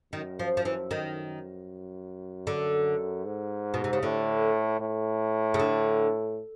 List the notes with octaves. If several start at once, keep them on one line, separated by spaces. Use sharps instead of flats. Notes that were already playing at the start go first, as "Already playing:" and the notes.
F#2 D#3
F3
F3
E3
D#3
D3
G#2
B2
C3
C#3
A2 D3
A2
C#3
D3